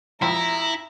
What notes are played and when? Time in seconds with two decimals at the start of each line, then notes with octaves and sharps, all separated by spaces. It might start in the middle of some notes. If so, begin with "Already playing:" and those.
0.22 F2 E4 A#5